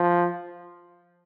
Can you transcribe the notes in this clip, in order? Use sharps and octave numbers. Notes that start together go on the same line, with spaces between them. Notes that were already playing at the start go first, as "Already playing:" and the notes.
Already playing: F3